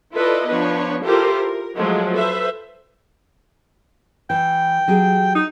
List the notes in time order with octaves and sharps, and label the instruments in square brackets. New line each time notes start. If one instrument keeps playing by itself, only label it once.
[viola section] E4 F4 A4 B4 D5 D#5
F3 B3 D4 B4 C#5
E4 F4 G4 A4 A#4 C5
A#4
F3 F#3 G#3 A3
A4 B4 C5 E5
[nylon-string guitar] E3 [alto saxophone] G5
[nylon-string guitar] F#3 G4 G#4
[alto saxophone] D#4